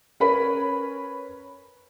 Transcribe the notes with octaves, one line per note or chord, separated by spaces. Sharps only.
C#4 A#4 B4 C#5 B5